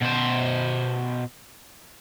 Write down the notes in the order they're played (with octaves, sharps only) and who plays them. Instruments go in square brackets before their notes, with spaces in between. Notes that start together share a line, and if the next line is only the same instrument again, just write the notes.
[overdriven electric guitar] B2 C5